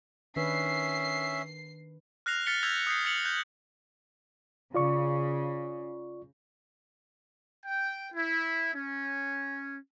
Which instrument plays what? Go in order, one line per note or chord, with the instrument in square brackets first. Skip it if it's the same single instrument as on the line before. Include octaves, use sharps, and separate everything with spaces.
[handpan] D#3 D4 B4 [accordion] C#4 [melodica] E5 [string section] C7
[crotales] F6 F#6 A#6 C7 F7
F6 A6 B6 C#7 G7
E6 F6 G6 G#6 B6 F7
D#6 G6 C7
E6 A6 C#7 F7 F#7
F#6 G6
[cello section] C#3 [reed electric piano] F4 D5 C#6
[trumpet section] G5
E4
C#4